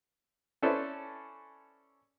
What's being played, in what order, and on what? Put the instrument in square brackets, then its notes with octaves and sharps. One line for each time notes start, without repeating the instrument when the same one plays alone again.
[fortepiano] C#4 E4 A4 B4 C5 D5